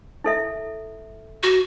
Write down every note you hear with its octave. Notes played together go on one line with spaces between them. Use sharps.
E4 A4 E5
F#4